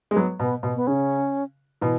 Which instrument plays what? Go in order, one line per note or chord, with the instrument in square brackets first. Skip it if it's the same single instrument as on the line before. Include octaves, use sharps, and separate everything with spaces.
[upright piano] G#3
F#3 B3
[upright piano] B2 [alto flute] B3
[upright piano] B2
[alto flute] B3
[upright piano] C#3 [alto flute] C#4
[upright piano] B2 E3